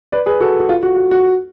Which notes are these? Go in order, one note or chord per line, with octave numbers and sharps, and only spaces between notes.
B4 D5
G#4 B4
F#4 A4
F#4
F4
F#4
F#4
F#4